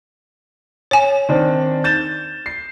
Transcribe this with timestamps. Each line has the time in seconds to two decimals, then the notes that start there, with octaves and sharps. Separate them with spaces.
0.91 C#5 G#5
1.29 D#3 C4 D4
1.84 G6 A6 E7
2.46 C7